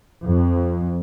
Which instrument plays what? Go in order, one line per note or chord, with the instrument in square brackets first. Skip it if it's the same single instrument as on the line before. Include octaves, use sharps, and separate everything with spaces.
[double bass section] F2